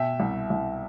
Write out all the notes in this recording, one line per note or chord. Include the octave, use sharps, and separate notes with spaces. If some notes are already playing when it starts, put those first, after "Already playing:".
Already playing: B2 E5 G5
C2
C2